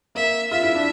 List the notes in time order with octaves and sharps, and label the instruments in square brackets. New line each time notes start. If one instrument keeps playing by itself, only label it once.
[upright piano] A#3 [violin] E5
[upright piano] F4 [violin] E5
[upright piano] E4
D4